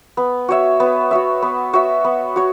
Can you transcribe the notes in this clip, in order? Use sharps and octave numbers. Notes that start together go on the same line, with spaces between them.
B3
F#4 C#5 E5
B3
F#4 C#5 E5
B3
F#4 C#5 E5
B3
F#4 C#5